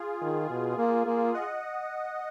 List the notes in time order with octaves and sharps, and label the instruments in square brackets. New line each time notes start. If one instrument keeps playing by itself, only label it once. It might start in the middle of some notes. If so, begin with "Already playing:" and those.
Already playing: [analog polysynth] F4 G#4
[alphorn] D#3
B2
A#3
A#3
[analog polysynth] D#5 F#5